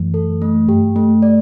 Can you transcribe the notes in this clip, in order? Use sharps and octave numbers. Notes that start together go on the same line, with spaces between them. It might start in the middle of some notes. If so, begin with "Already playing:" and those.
Already playing: F#2 E3 F#3 A3
A4
A3
G2 G4
A3
D5